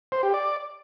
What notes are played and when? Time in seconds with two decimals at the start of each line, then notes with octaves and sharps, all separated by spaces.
0.12 C5
0.23 G4
0.34 D5